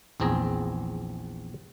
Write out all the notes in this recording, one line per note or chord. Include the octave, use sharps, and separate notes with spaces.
A#1 E2 C4 G#4 A#5